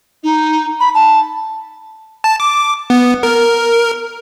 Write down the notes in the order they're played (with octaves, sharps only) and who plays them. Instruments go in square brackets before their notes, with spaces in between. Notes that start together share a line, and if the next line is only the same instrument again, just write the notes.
[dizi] D#4
B5
A5
[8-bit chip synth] A5
D6
B3
A#4